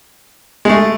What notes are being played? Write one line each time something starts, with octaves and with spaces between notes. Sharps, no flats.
G#3
A3